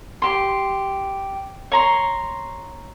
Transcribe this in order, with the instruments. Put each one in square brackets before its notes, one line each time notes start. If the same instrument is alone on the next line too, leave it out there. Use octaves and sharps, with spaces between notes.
[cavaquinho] G4 C6
C#5 A#5 C6